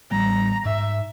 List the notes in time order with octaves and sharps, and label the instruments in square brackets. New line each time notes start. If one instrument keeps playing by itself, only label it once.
[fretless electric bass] A1 G3 B3 [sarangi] A#5
[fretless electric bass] G#2 [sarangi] E5